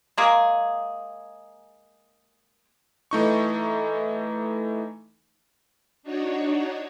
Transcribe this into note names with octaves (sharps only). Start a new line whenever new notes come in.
G#3 A#3 G#4
E3 A3 D#4 C#6
D4 D#4 F#4 C#5